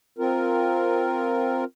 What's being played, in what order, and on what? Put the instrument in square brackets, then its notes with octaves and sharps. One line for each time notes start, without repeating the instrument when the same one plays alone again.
[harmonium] C4 F4 A#4